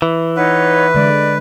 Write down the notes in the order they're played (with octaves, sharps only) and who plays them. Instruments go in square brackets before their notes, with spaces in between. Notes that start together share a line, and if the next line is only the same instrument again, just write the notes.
[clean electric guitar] E3
[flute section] D#4 C#5 F#5 [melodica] B4
[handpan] D3 G#3 [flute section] D5